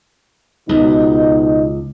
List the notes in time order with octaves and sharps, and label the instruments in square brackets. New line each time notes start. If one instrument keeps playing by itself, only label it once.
[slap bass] C#2 [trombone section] B2 D#4